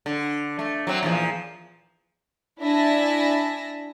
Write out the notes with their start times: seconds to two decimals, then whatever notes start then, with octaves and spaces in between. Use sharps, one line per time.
0.06 D3
0.59 A3
0.87 F#3 C4
1.03 E2 A#2 F3
2.60 D4 E4 E5 G#5 A5 A#6